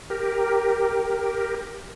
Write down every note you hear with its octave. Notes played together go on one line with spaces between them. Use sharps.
G4 A#4